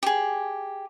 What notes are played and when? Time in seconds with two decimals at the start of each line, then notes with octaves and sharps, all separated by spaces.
0.03 G4 G#4